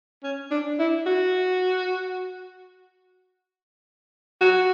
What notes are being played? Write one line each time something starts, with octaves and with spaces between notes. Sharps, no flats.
C#4
D4
E4
F#4
F#4